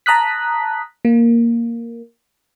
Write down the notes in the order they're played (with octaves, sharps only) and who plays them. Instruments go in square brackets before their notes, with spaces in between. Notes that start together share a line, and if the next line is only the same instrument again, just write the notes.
[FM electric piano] A5 A#5 D#6 F#6 B6
A#3